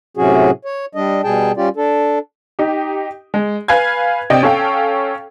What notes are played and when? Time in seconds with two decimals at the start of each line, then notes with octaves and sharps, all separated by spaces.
0.17 A2 C3 F#3 C#4 F#4 G#4
0.65 C#5
0.95 G3 D4 D#5
1.24 B2 G3 G#4 G5 A5
1.57 G3 C#4 F4 G4 D5
1.76 D4 A4
2.59 D#4 G4
3.34 G#3
3.68 B4 F5 G#5 G#6
4.30 C3 D5 D#5 G5
4.43 C#4 A4 F5 G5